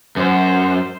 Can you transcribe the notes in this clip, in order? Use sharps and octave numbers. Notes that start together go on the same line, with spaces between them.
F#2 C5